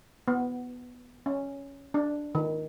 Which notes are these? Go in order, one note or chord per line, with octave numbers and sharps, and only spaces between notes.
B3
C#4
D4
D#3